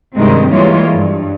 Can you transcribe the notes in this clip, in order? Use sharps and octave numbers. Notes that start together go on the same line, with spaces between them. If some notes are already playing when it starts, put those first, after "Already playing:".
G2 C3 D#3 G#3 C4
E3 G3 G#3 A#3 F4 C#5
G2